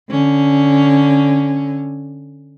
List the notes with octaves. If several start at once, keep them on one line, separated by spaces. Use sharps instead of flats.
D3 C#4